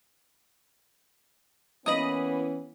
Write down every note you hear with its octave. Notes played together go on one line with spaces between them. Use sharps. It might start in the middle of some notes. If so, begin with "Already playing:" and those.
E3 A#3 B3 C#4 D#5 B5 D#6